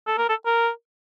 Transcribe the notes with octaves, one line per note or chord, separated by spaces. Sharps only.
A4
A#4
A4
A#4